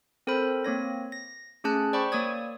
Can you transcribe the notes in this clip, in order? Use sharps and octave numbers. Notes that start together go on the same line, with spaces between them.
C4 A4 A#4 C5 B5
A#3 C4 C#5 A#6
A#6
A3 C#4 G#4 A5 F#6
C5 D5 G5 B5 C#6
A#3 C#5 D5 D#6 G#6